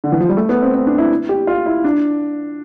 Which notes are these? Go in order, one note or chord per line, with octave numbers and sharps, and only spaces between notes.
D3
E3
F3
G3
A3
B3
C4
C4
D4
E4
G4
F4
E4
D4